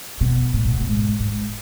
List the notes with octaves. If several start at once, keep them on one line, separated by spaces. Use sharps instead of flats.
B2
A2
B2
A2
G#2
G#2